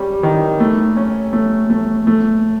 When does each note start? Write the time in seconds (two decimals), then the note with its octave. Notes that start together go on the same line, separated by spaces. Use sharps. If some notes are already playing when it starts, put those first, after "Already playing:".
Already playing: G3 C#4
0.23 D#3
0.60 A3
0.97 C#4
1.33 A3
1.70 A3
2.07 A3